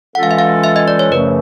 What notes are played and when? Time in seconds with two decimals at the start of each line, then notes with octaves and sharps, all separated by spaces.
0.15 E3 G#3 C#4 F4 A4 F#5
0.23 F5
0.31 E5
0.39 F5
0.64 E5
0.76 D#5
0.88 D5
0.99 C#5
1.11 F#2 C#3 F3 A3 C#4 B4